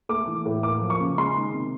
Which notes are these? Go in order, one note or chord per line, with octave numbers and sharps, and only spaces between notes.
A3 D6
E3
A2
A#3 D6
F3
C#6
C#3
G#3 C6
D#3
C3